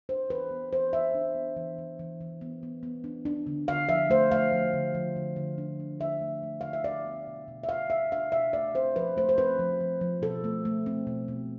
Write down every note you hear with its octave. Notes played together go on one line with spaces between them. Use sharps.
D4 C5
E3 B4
B3
E3 C5
E3 E5
D4
B3
E3
E3
E3
E3
B3
B3
B3
D4
D4
D3
D3 F5
F3 E5
A3 C5
A3 F5
F3
D3
F3
D3
D3
D4
D4
D4 E5
A3
A3
D3 F5
E5
D4 D5
B3
B2
B2
E5
B2 F5
B2 E5
D4 F5
B2 E5
A3 D5
C4 C5
F3 B4
A3 C5
C5
C4 B4
F3
F3
F3
B2 A4
A3
A3
C4
B2
B2